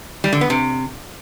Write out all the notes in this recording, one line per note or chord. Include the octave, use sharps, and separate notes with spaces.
G3
D3
B3
C3